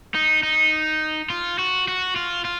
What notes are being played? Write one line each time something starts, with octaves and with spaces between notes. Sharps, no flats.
D#4
D#4
F4
F#4
F#4
F4
F4